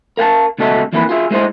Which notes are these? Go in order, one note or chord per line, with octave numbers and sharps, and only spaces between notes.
A#4 F5 F#5 A5
C#2 B2 B3 A4 D#5 E5
F2 E3 A#3 E4 A4 B4
F4 G#4 E5
G#3 E4 B4 C5 D#5